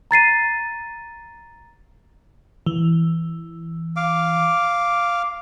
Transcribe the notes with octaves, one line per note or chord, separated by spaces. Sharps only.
A#5 A6 C7 D#7
E3
F5 D6